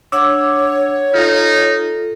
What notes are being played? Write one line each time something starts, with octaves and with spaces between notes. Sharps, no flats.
D4 C#5 F#5 D6 E6
D#4 F4 A4 F6